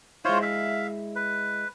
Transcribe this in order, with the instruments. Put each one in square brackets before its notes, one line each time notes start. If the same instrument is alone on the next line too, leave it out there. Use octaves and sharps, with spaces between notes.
[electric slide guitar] G#3 E4 [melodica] F4 C5 C#5
[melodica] E5 F5
B4